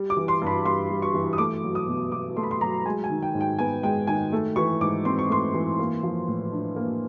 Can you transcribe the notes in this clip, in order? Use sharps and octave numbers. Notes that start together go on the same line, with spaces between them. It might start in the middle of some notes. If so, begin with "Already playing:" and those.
Already playing: G3
D6
E3
C6
G2 B5
G2 C6
G3
C#6
E3
D#6
A3 D6
F#3
D#6
B2
B2 D6
A3 C6
B5
C6
F#3 A#5
G#3 G#5
G#5
D#3
G5
G#2
G5
B3 G#5
G#3 G5
D#3 G#5
A3
E3 C#6
G#2 D6
C4 C6
C#6
A3 C6
E3
A#3
F3
A2
D4
A#3